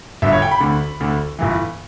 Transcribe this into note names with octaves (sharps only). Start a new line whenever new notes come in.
G1 G2 D3 E5
C#5
G5
B5
D2 D3
D2 D3
G1 G2 E3